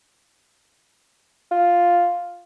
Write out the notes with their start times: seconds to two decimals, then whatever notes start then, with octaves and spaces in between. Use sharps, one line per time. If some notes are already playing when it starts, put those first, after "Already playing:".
1.52 F4